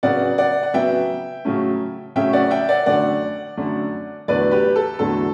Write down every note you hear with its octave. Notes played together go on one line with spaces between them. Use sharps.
C#3 F#3 B3 D5 F#5
D5 F#5
F#5
C#3 F#3 B3 E5 G5
C#3 F#3 A3 C#4
C#3 F#3 A3 C#4 E5 G5
D5 F#5
E5 G5
D5 F#5
F#2 D3 A3 D5 F#5
F#2 D3 A3
E2 D3 F#3 A3 B4 D5
G4 B4
A4
E2 D3 F#3 A3 A4